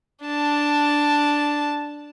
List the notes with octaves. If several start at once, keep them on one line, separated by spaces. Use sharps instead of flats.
D4 A5